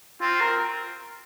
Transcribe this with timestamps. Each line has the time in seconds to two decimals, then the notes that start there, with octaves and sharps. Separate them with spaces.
0.21 C4 F4
0.41 A#4